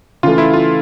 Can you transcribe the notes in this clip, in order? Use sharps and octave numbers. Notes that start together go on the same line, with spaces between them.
C#3 E3 A3 F4
E4
F4